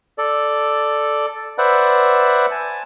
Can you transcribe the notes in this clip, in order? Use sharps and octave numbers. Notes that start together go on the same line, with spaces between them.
A4 D5
B4 C5 D5 E5 F#5
G#5 A5